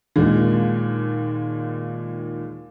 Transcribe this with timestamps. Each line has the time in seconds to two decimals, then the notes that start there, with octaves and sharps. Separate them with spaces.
0.16 D#2 A#2 G#3